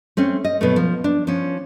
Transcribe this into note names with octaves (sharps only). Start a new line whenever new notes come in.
A3 C4 C#4
D#5
B2 F#3 A3
F3
D4
F3 C#4